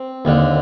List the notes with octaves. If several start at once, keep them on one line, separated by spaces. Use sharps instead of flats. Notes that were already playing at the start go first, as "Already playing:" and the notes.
Already playing: C4
D#2 D3